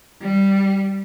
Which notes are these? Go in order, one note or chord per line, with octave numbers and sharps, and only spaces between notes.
G3